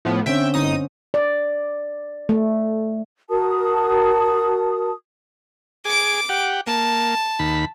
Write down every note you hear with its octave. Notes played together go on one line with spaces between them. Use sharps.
A2 F3 B3
D3 C4 C#4 E5 G5
G1 D#4 D#6
D5
A3
F#4 A#4 A5 D#6
G#4 D6 D7
G4 F#5
A#3 A5
D#2 B5